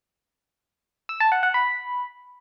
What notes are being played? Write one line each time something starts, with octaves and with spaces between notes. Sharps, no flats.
E6
A5
F#5
F#5
B5